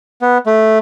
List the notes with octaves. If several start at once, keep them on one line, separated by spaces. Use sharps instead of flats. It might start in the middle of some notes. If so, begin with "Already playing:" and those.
B3
A3